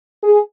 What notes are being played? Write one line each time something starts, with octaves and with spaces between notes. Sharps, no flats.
G#4